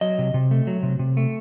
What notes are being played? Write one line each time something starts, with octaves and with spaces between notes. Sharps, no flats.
F#3 D#5
C3
C3
A3
F#3
C3
C3
A3